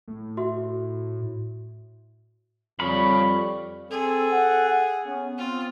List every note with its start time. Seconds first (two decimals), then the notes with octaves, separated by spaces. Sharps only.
0.08 A2
0.37 F#4 E5 C6
2.80 F2 G3 C#5 F5 B5
3.91 C4 G#4 A4
4.32 F#5
4.69 F#5
5.06 B3 C#4
5.38 C4 F4